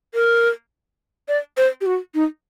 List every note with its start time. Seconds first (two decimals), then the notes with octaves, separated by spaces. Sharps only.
0.14 A#4
1.28 D5
1.57 C5
1.81 G4
1.86 F#4
2.15 D#4